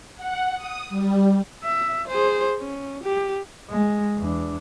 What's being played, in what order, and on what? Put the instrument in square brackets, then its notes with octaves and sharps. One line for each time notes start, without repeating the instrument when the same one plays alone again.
[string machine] F#5
D#6
G3
[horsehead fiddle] E5
G#4 C5
C#4
G4
[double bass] G#3
E2 D4